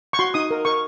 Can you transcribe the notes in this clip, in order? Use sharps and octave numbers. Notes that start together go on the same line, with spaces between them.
C#6
F#4 C6
D#4 D#6
A#4
A#4 C#6